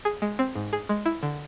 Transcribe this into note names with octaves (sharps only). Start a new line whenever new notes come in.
G#4
G#3
C4
G#2
G#4
G#3
E4
D3